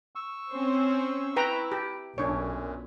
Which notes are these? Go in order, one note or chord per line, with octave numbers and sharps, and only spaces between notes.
C#6 E6
C4 C#4 C5
E4 B4 G5 A#5
G4
B1 F#2 A#2 D4 C#5